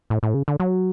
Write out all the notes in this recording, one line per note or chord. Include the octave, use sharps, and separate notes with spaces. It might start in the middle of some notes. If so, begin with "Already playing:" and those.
A2
A2
C#3
D3
F#3